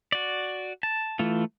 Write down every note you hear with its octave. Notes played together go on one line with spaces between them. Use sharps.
F#4 D5
A5
E3 A3 F4